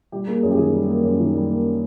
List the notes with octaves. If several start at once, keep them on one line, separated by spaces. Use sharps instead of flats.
G3 G4
A#3 G#4
F#2 G#4
G4
D#3 G#4
G3
A#3
F#2
D#3
G3
A#3